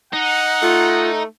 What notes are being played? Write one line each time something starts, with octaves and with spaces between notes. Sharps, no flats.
D#4 F#5
A3 F4